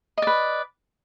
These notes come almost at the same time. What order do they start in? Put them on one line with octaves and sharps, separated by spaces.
D#5 D5 B4